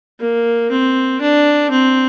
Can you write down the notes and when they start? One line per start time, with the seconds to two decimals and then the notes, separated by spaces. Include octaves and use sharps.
0.20 A#3
0.71 C4
1.21 D4
1.71 C4